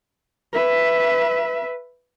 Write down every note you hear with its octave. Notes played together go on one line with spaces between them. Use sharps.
B4 E5